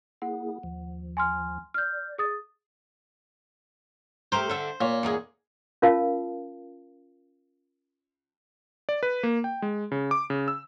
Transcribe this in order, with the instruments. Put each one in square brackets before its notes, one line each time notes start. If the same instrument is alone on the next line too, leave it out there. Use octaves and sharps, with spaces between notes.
[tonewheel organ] A#3 E4 G#4 [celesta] F#5
[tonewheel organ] D#2 F3
[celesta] G#5 C6 F6
[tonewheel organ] D5 [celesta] F6 G6
[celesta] G#4 D#6 A6
[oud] A3 G4 A#4 [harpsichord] C5
[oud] D3 E5
[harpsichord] A#2 [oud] C#5
[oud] E2 D#4 G#4
[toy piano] C#4 F4 A#4 F5 A5
[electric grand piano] D5
B4
A#3
G5
G#3
C#3
D6
C#3
E6